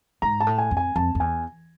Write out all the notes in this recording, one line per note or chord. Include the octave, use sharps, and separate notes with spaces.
G#2 A#5
A5
A2
G#5
F2
G#5
F2 A5
F2
E2 G#5